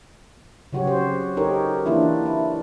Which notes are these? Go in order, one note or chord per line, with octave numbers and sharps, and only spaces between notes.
C#3 F#3 F#4 G4 C#5
C5
D#4 G4 A4 A#4 C#5
E3 A#3 D4 E4 F4
E4